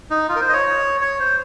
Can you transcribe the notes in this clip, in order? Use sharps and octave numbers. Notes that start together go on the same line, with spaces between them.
D#4
F4
A#4
C5
D#5
C#5
C#5
C5